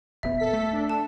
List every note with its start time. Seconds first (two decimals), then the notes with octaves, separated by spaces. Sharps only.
0.23 D#1 B3 E5
0.38 A4 B6
0.53 A3
0.73 D4
0.90 A5